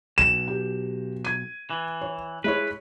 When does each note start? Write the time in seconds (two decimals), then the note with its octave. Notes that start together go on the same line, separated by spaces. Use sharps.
0.18 B1 E7
0.48 G4
1.25 G#6 D#7
1.70 E3
2.01 C#5
2.44 G#3 E4 B4 C#5